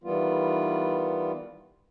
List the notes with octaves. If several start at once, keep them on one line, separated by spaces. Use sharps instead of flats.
D#3 E3 G3 B3 F4